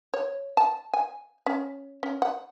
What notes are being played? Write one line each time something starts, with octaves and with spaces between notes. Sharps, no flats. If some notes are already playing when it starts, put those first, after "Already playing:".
C#5
A5
G#5
C#4
C#4
F#5